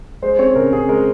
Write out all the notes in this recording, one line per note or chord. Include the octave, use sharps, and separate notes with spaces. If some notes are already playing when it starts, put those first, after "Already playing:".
G#3 C5
C4 C#5
C#3 A#4
C#3 G#4
G#3 A#4